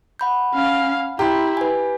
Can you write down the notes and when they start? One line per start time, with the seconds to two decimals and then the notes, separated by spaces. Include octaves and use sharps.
0.19 F#5 B5 G6
0.54 C#4 F5
1.19 E4 G4 A#5 C6
1.57 B4 G#5